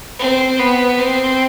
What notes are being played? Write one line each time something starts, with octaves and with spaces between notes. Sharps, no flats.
C4
B3
C4